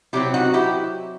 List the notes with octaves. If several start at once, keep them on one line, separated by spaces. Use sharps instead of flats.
C3 F#3 C4 E4 G4
D#4 F#4
E4 G4